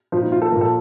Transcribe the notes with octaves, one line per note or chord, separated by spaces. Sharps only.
A#2 F3 F4
D#4
F4
A4
A#2 F3 A#4
A4